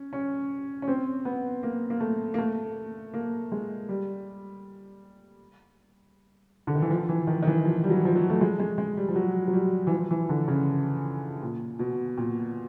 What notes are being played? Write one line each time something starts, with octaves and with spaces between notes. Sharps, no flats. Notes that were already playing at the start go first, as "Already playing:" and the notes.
Already playing: C#4
C#4
C#4
C4
B3
A#3
A#3
A3
A#3
A3
A#3
G#3
G3
D3
D#3
E3
F3
E3
D#3
D#3
E3
F3
G3
F#3
F3
F#3
A3
G#3
G#3
G#3
G3
F3
F#3
F#3
G3
E3
F3
E3
D3
C#3
A#2
B2
A#2